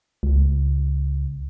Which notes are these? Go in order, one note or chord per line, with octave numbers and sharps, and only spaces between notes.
C#2